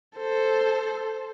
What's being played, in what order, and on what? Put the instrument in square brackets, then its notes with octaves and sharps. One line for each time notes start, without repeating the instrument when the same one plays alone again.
[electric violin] A4 C5